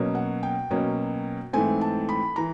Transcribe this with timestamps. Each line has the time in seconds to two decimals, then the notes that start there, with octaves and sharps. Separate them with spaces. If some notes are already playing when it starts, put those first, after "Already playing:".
Already playing: B2 F#3 A#3 C#4
0.15 F#5
0.43 G5
0.70 B2 F#3 A#3 C#4
1.53 G#2 E3 A3 C4 G#5
1.81 A5
2.09 B5
2.36 E3 A#5